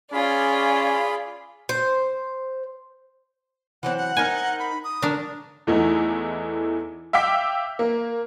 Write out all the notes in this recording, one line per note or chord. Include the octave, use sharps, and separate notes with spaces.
C#4 F4 G#4 D5 B5
C5
E3 F#3 C4 F#5
F#5
C4 D#4 A#4 G#5
B5
D#6
D3 D4 A#4
E2 E3 A3 D#4 E4
E5 F5 G5 D6 B6
A#3